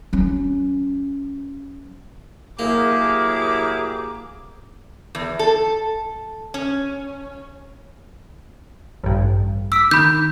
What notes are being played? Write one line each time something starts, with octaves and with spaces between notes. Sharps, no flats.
F#3 C#4
A2 F#3 A#3 E4 G4 G#4 A#4 D6
E2
A4
C#4
A1 G2
D6 E6 B6
D#3 B5 G6